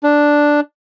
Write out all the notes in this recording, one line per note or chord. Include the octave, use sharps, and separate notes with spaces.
D4